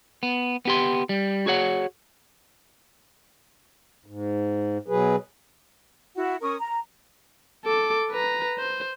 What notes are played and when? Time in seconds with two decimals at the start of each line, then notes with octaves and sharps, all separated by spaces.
0.23 B3
0.65 B3 G4 C6
1.09 G3
1.46 F#4 G#4 C#5 F#5
4.06 G#2
4.88 B2 F#3 G#4 B4
6.16 E4 F#4 F#5
6.41 C#4 A#4 C#6 D#6
6.59 A#5
7.65 A4 D6
8.11 B4 A#5
8.59 C5